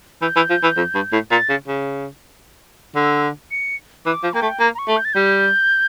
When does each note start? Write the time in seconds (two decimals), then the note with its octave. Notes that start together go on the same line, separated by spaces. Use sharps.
0.22 E3 G6
0.36 E3
0.50 F3
0.64 E3
0.77 F2
0.95 G2
1.13 A2
1.31 A#2 A6
1.50 C#3
1.68 C#3
2.96 D3 E6
3.51 C#7
4.06 E3 D6
4.23 F3
4.33 A#3 G5
4.42 A3
4.60 A#3 A#5
4.75 A#5
4.79 C#6
4.88 A3
4.96 G6
5.05 A6
5.13 G3 G6